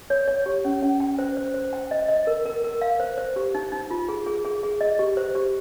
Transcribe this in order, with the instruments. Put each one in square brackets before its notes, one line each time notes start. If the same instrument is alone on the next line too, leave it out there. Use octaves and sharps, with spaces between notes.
[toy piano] C#5
C#5
G4
C#4
C#4
G5
C5
C5
C5
G5
D#5
D#5
A#4
A#4
A#4
F5
C5
C5
G4
D#4
D#4
F4
G#4
G#4
G#4
G#4
D#5
G4
C5
G4